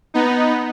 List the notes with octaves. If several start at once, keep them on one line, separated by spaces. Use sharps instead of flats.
B3 D#4